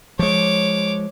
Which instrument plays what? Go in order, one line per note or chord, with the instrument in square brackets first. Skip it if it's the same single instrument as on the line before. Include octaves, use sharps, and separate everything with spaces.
[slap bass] F3 G#3 [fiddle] C#5 D6